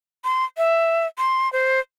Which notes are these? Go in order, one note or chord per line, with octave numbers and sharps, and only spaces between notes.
C6
E5
C6
C5